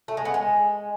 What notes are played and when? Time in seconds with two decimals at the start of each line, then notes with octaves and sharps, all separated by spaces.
0.08 A3
0.17 G#3
0.25 B3
0.34 G#3